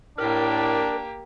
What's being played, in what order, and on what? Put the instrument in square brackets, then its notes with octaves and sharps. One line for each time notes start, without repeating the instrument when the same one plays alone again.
[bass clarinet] A2 [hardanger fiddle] A#3 G4 [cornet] D4 [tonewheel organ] A#4